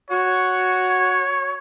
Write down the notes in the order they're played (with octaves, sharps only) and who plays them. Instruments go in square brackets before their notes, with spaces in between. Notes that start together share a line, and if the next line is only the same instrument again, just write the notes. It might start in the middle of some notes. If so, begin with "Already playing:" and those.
[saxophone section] F#4 [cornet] C#5